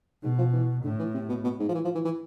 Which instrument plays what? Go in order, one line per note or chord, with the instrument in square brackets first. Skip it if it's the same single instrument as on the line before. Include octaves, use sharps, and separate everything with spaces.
[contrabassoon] G#2 [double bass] B2
[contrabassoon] F3
E3
[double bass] A2 [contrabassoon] D3
[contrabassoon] E3
C3
B2
B2
G#2
F3
E3
F3
E3
E3